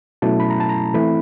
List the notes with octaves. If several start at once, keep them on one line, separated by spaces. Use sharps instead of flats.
B2 F#3 A3 C#4 E4 A5
B5
A#5
A5
A#5
E3 A3 C4 E4 B5